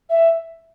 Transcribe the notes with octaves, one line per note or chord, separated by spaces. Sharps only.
E5